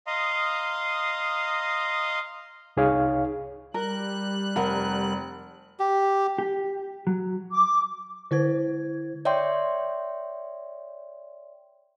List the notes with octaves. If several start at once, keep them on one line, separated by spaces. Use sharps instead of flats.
D#5 F5 A#5 C6 D#6
C2 D#4 G#4 C#5 F5
G3 A#4 F#6
F1 A#4 F#5
G4
G4
F#3
D6
D3 E4 C5 G#6
C#5 D5 E5 G5 C6